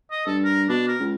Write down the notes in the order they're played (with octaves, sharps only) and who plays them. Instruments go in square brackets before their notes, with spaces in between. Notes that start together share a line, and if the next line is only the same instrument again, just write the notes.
[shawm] D#5
[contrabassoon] G2 [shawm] A4
[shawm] A#4
[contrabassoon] B2 [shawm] D4
[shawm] A#4
[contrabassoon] C#2